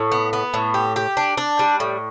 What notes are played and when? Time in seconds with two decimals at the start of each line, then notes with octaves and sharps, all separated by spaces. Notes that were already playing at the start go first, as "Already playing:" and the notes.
Already playing: A2
0.12 B3
0.33 B3
0.54 A2
0.74 G4
0.96 G4
1.17 D4
1.37 D4
1.59 G3
1.80 A2